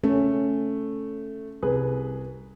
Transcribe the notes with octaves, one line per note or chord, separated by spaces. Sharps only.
A3 C#4
C2 G#4 B4